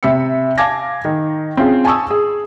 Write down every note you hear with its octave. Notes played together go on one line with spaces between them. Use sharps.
C3 E5 B5 E6 C#7
F5 G#5 A5 D6 G#6 A#6
D#3
C4 C#4 F4 G#4
G#5 A5 B5 C#6 D#6 E6
G#4